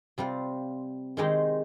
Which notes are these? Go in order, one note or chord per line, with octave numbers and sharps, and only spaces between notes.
C3 G3 C4 F4
D#3 G#3 C4 D#4 G4